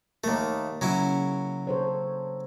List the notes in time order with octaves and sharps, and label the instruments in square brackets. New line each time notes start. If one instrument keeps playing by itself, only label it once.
[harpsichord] D#2 A3 [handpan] A#3 A#4
[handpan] C#3 [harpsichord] F#3 C#4 E4
[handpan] A4 C5 C#5